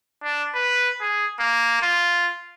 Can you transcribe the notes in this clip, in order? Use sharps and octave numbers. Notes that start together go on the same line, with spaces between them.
D4
B4
G#4
A#3
F4